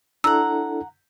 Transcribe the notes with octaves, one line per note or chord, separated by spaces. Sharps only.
D4 E4 A4 F#5 A#5 E6